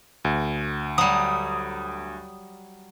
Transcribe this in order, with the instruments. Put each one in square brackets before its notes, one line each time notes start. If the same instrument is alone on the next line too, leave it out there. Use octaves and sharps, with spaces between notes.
[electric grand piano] D2
[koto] F#3 G3 [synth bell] D#6